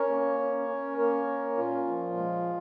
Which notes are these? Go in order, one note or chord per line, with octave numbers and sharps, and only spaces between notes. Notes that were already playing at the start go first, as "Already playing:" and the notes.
Already playing: C#4 A#4 C#5
A#3
C#4
C#4
A#3 A#4 C#5
C#4
A#2 F4
F3
G#3